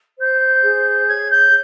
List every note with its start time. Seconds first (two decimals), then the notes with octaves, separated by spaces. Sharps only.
0.19 C5 G6
0.64 G#4
1.08 C#5 G#6
1.30 G6